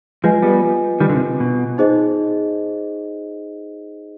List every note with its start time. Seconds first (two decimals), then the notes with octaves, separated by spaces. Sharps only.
0.24 F3 G#3 F4 B4 D#5 G#5
0.42 G3 B3
1.00 D#3 G3
1.09 D3
1.15 C3
1.40 B2
1.78 D#4 G#4 C5 D#5